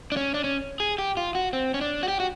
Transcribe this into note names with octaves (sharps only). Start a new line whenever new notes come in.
D4
C#4
D4
C#4
G#4
G4
F4
F#4
C4
C#4
D4
F#4
G4
F#4